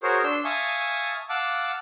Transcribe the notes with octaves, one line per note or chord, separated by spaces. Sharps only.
F#4 G#4 A#4 C5 C#5
D4 C6 E6
E5 F5 G#5 A5 C#6 D#6
F5 F#5 A5 D6 E6